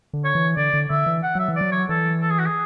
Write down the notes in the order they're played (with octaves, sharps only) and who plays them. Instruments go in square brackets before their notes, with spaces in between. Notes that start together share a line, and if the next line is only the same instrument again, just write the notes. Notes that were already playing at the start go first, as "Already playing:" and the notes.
[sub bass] D3
[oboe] C#5
[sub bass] E3
[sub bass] D3 [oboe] D5
[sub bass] D3
[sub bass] D3 [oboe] E5
[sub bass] E3
[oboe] F#5
[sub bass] F#3 [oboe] E5
[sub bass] E3
[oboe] D5
[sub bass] F#3
[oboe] C#5
[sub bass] E3 [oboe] A4
[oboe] A4
G#4
F#4
G#4